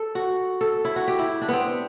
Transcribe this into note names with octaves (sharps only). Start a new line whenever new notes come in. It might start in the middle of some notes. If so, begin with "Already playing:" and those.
Already playing: A4
F#4
A4
E4
F#4
G4
E4
D4
B3 C4